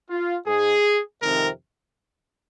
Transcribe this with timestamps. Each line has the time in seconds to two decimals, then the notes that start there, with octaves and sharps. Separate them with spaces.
0.10 F4
0.47 G#2 G#3 G#4
1.23 F2 C3 D#3 G#3 A#4